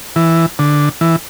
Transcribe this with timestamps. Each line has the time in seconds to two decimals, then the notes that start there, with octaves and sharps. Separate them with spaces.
0.16 E3
0.59 D3
1.01 E3